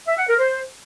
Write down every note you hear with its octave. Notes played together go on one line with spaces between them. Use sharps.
E5
F#5
A#4
C5